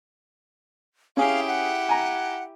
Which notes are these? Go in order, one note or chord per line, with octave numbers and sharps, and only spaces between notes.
C#4 E4 G4 G#4 F5
F#5
G#5 A#5